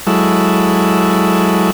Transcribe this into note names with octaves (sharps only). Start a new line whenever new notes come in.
F#3 G#3 E4 A4